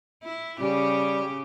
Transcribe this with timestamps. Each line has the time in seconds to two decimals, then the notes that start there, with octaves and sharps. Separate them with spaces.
0.23 E4
0.60 C#3 G3 G4